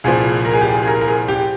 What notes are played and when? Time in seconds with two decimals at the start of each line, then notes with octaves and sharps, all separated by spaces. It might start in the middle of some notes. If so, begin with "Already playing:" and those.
0.04 C2 A#2 F3 G#4
0.45 A#4
0.54 G#4
0.61 G4
0.69 G#4
0.83 G#4
0.88 A#4
1.01 A#4
1.08 G#4
1.28 G4